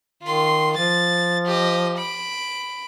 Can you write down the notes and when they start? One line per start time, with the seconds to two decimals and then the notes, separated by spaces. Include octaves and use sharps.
0.23 D#3 F4 C6
0.77 F3 A6
1.46 G4 D#5
1.98 B5 D7